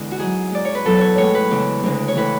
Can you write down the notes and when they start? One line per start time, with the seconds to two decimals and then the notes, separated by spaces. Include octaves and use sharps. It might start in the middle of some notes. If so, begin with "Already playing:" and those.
Already playing: E2 D3 G#3
0.12 F#4
0.19 G#2 F#3 G#4
0.52 G#2 G#3 D5
0.65 C#5
0.75 B4
0.84 E2 B2 F#3 A4
0.97 B4 C#5
1.17 A2 G#3 C#5
1.35 B4
1.51 E2 C#3 G#3
1.83 D2 C#3 G#3
2.08 C#5
2.15 A2 E3 G#3 B4